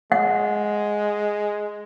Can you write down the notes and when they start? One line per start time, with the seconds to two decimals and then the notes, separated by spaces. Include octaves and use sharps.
0.12 G#3 F#5